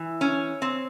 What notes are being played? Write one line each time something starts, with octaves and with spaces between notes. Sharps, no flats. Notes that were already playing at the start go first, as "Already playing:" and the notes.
Already playing: E3
C#4
C4